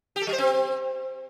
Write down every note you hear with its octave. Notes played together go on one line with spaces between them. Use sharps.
G4
A4
G3
C5
C4